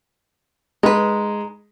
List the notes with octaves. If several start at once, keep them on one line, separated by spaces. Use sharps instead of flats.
G#3 D#4 B4